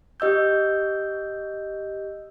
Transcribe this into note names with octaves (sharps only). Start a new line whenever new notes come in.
G4 D#5 E6 G6